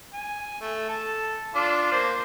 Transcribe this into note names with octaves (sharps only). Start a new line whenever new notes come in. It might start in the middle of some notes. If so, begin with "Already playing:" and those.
G#5
A3
A4
D4 F4 D6
A#3 C5